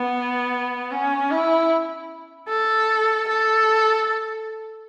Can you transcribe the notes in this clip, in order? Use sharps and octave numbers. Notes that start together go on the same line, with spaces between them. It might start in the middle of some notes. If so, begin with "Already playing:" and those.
Already playing: B3
C#4
E4
A4
A4